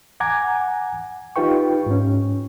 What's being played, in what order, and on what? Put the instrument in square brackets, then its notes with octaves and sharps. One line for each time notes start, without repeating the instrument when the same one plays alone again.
[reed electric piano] F#5 G#5 A#5 D6 G#6
D#4 F4 G4 B4 G5 C#6
G#2 C#4